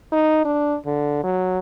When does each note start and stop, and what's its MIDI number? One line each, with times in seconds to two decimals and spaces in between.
0.12 0.44 63
0.45 0.76 62
0.86 1.19 50
1.23 1.59 54